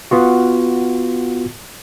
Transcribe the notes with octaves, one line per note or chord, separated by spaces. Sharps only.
B3 F4 F#4